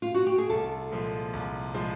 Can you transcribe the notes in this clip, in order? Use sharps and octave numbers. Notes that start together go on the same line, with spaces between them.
F4
F#4
G4
G#4
C2 A4
A#2 F3 G#3
C2
A#2 F3 G#3